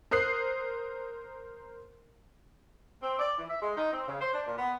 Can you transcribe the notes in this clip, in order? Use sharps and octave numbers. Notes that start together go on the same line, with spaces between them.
A#4 C5 D#6 F#6 C7
C4
D5
E3
E5
G#3
D#4
C4
C#3
C5
D4
A#2
B3